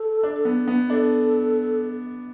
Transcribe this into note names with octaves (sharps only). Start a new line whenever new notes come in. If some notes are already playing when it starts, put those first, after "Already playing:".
Already playing: A4
D4
B3
B3
D4 A4